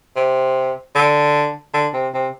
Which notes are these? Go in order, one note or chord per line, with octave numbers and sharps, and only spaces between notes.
C3
D3
D3
C3
C3